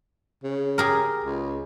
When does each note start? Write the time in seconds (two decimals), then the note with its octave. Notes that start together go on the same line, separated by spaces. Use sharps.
0.44 C#3
0.78 G4 G#4 A#4
1.24 C#2